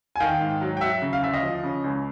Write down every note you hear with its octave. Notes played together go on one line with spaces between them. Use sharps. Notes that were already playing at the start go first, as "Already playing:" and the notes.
G#5
D#3 F5 G5
G#2
F#3
G5
F#3 E5 F#5
C#3
F5
D2 E5
D#5 F5
F3
C#3
C#2